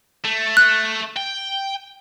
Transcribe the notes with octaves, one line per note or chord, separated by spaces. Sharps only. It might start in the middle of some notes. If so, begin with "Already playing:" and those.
A3
F#6
G5